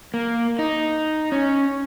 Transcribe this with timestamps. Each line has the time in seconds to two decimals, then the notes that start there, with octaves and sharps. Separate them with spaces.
0.14 A#3
0.59 D#4
1.32 C#4